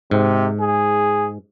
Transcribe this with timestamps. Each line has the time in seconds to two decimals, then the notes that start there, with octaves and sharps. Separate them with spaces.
0.11 G#2 C3
0.61 G#4